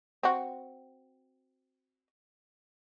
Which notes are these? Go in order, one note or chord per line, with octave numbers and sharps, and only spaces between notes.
C4 F#4